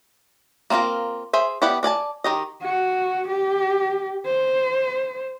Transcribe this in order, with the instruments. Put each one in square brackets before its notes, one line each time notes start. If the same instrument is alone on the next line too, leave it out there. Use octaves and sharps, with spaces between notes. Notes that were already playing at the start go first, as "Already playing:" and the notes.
[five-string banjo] A#3 C4 E4 F4 A#4
G#4 C5 E5
B3 E4 G4 D5 F#5
D4 D5 G#5 A5
D#3 G4 D#5
[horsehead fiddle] F#4
G4
C5